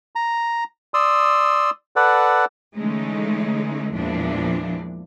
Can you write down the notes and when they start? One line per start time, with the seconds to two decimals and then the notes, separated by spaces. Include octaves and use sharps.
0.15 A#5
0.94 D5 C6 D#6 E6
1.96 A4 B4 D5 F#5
2.76 D3 E3 G#3 A3 C#4 D#4
3.93 E2 A#2 E3 F3 G#3 D4